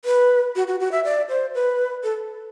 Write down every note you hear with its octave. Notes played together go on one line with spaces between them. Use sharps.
B4
F#4
F#4
F#4
E5
D5
C5
B4
A4